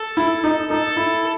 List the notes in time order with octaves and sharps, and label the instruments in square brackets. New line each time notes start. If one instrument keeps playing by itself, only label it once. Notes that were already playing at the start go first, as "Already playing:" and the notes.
Already playing: [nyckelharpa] A4
[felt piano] E4
D#4
[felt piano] D#4 [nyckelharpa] A4
[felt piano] E4